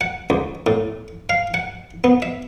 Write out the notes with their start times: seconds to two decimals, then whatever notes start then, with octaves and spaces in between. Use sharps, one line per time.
0.01 F#5
0.30 C#2
0.67 A2
1.29 F5
1.54 F#5
2.04 B3
2.22 E5